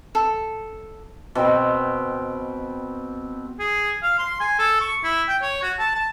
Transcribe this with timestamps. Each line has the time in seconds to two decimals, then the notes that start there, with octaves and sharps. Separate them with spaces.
0.15 A4
1.35 B2 C4 B4 G5
3.59 G#4
4.02 F5
4.18 C6
4.40 G#5
4.59 A4
4.80 C#6
5.03 E4
5.28 G5
5.42 C#5
5.63 F#4
5.79 A5
5.95 A5